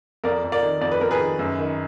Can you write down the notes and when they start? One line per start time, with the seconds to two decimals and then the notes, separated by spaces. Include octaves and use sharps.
0.24 F2 A#4 D5
0.44 F2
0.52 A#4 D5
0.63 D#3
0.81 F2 D5
0.92 B4
1.01 F2 A#4
1.11 G#4 B4
1.19 D#3
1.39 F#2
1.59 D#3